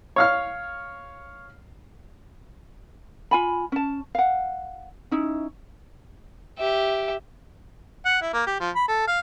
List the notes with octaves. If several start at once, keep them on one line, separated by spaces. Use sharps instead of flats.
C#5 F5 F6
F4 G#5 B5
C#4 A5
F5 F#5
C#4 D#4 E4
G4 E5
F#5
E4
A#3
G4
F3
B5
A4
F5